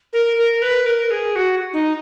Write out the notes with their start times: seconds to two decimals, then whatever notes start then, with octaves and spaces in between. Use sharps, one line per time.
0.13 A#4
0.37 A#4
0.62 B4
0.86 A#4
1.11 G#4
1.36 F#4
1.73 D#4